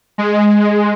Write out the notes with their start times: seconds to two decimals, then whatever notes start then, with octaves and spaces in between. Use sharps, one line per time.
0.18 G#3